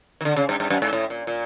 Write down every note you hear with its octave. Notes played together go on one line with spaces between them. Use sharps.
D#3
D3
C#3
G2
G2
F#2
G#2
A2
A#2
A#2